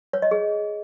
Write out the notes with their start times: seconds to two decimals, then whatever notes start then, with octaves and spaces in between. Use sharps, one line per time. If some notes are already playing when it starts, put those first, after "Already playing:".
0.13 C#5
0.22 D#5
0.31 G#4